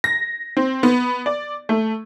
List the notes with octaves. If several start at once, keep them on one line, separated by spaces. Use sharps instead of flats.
A#6
C4
B3
D5
A3